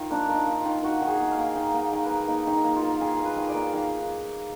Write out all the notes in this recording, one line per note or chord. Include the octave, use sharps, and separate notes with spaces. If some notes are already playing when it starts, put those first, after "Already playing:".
Already playing: D#3 F4
A#3 D4
A#3
D#4
A#3
F4
D#3
D#3 F#4
D#3
G#4
A#3
F5
A#3
D#3 D#5
A#3
D#3 A#4
B4
A#3
A#3 D#4
D#3
D#4
A#3
F4
A#3
D#3 G#4
A#3
B4
D#3
D5
A#3
D#3 F5